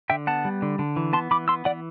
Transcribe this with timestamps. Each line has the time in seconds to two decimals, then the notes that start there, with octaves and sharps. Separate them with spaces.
0.10 D3 E5 G5
0.27 B3 F#5 A5
0.45 G3
0.62 D3
0.79 D3
0.96 E3
1.13 B3 A5 C6
1.31 E3 B5 D6
1.48 B3 C6 E6
1.65 E3 D5 F#5